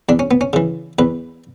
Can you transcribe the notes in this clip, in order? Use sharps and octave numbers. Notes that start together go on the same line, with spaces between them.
E2 D4
C#4
B3
C#4
C#3 E3
E2 B4